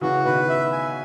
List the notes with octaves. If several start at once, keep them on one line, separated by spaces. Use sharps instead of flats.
C#3 E3 F#4
B2 D#3 B4
E5
G#5